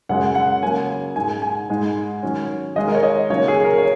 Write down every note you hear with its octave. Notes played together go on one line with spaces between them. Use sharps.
F#2 C#3 G#3 F#5
F#5
C#3 F#3 A#3 C#4 G#5
G#2 G#3 D#4 G#5
G#5
G#2 G#3 D#4
D#3 F#3 C#4
D#3 G#3 D#4 D#5
A#4
C#5
D#5
C#3 F#3 A#3 D#4 C#5
G#4
A#4
C#5